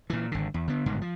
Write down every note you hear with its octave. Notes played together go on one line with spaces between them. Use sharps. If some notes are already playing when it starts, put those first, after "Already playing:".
A#2 E3
G#1 D3
E2
D3 B3
G1 G#2 B2 D#3
F3